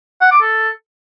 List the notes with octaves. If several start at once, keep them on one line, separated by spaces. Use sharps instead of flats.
F#5
D6
A4